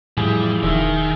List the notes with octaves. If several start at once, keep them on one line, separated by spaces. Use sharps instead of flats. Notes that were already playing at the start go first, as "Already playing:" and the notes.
F2 A2 E3 G3 G#4
E1 D#3 E5